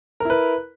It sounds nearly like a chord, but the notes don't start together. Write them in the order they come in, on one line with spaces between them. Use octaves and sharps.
A#4 E4 B4